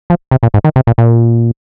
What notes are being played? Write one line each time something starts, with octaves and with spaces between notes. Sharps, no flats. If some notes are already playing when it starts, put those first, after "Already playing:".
F3
C3
A#2
G#2
D#3
C3
A#2
A#2